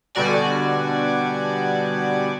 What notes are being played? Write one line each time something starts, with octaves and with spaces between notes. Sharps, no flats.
B2 D3 G3 F#4 D5 G#5